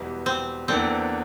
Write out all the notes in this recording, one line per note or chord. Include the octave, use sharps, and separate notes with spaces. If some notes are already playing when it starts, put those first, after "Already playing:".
Already playing: E1 E2 E3 G3
C4
E2 E3 A#3 C4 D4 A4